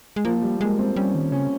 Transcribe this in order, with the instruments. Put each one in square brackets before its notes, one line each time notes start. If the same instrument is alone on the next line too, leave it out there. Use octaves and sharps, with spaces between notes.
[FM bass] G#3
[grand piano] F3 [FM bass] A#3
[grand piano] F3
G3
[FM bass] G#3 [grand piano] A#3
[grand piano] C4
[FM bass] G3 [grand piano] C#4
[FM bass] D#3
[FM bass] C#3 [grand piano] C#4